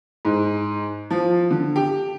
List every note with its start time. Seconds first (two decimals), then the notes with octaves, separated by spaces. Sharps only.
0.25 G#2
1.10 F3
1.51 D3
1.76 G4